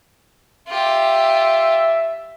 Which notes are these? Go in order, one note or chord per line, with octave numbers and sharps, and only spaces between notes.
F4 G4 E5